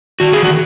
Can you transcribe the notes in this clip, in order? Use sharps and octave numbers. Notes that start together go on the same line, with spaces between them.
D#3 F#4
G#4
F#4